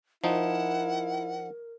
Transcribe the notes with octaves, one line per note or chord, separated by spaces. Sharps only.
F3 D#4 E4 A#4 F#5